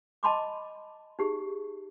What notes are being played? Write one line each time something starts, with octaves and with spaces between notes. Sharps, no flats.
D#5 A5 B5 C6 D6
D#4 G4 G#4